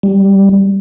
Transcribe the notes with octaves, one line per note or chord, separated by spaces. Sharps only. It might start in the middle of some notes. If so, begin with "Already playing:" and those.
G3